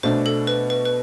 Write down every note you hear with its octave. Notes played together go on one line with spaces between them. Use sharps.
B2 A3 D4 C5
A4
B4
B4
B4